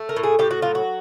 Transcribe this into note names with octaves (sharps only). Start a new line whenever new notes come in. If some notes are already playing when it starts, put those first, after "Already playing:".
Already playing: A3
A#4
A2
G#4
A2 G4
F#4
F#3 F4
F#4